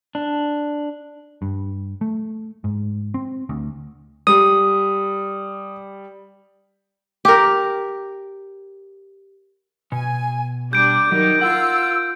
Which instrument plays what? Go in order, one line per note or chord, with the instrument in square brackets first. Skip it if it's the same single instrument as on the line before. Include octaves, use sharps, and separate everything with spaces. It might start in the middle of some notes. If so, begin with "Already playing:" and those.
[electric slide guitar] D4
[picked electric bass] G2
A3
G#2
C4
D2
[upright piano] G3 [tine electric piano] D#6
[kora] G4 A#4
[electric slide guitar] B2 [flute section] G#5
[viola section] G3 D4 [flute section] D6 [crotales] G6 D7
[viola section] D#3 D#4 [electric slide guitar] F#3
[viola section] F4 [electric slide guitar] A#4 F#5 [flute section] E6